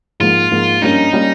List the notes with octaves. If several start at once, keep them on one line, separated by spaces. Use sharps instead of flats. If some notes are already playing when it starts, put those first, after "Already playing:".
G#2 F3 A#3 F4
G#2 F3 A#3
G2 G3 A#3 C#4 D#4
G3 A#3 C#4